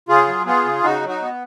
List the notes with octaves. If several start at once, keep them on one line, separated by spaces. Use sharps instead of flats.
C#3 F4 G#4
F#3
B3 F4 G#4
C#3
C#3 D#4 F#4
F#3
D#4 F#4
B3